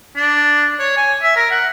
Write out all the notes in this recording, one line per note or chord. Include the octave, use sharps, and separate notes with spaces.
D4
C#5
G#5
E5
A#4
F#5